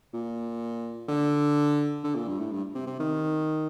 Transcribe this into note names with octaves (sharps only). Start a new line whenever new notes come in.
A#2
D3
D3
A#2
G2
A2
G2
C3
C3
D#3